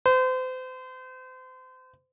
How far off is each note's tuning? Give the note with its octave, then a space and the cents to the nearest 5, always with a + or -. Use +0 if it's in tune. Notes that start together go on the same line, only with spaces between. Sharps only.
C5 -35